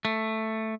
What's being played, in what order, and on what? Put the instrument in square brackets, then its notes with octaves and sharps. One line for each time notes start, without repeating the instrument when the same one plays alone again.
[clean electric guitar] A3